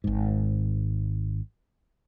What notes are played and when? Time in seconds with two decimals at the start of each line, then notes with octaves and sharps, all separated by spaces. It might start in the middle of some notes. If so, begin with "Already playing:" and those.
0.04 G#1 G#2